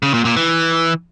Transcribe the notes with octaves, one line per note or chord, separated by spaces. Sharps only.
C#3
A#2
A#2
E3